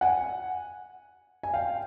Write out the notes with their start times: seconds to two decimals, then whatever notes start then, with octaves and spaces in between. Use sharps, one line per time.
0.01 F#5 G#5
1.43 G#5
1.54 F5 G5